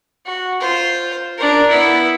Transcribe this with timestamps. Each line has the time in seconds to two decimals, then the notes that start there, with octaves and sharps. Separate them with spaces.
0.26 F#4
0.60 F4 C5
1.38 D4 A#4
1.69 B3 E4